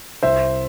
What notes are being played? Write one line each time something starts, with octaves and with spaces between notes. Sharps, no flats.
C2 C5 E5